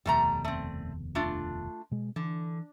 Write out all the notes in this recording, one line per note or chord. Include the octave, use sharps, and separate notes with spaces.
F1 D#2 B2 G3 A3 A#5
A3 C4
A3 D4 F4
B2 G#3
D3 E3